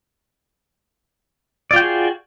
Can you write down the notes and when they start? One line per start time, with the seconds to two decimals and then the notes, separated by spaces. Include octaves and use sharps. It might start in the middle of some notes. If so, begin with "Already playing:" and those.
1.71 D5
1.73 F4
1.76 G5
1.79 F#4
1.82 G#4